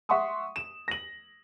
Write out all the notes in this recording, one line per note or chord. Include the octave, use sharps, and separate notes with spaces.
E5 F#5 C6 C#6 D#6
E7
A#6 F#7